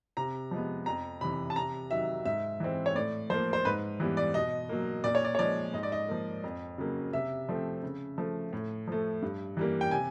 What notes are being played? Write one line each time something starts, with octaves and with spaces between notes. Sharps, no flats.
C3 A#5
F3 G#3 B3
F2 A#5
C3 E3 B5
A5
C3 A#5
D#3 F#3 E5
G#2 E5
E3 G#3 C4
C#5
A2 D5
F3 A#3 C5
C5
G#2 B4
E3 G3 B3
D5
B2 D#5
F#3 A#3
A#2 D5
C#5
D5
C#5
F3 G#3 D5
G#2 D#5
D5
D#5
F3 A#3
F2
C#3 F#3 A#3
C3 E5
F3 A3 C4
C#3
F3 A3
A2
F3 A3
G2
E3 G3 A#3
G5
C3 G#5